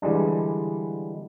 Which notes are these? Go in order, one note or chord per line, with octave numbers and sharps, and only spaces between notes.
D3 E3 G3 G#3 D4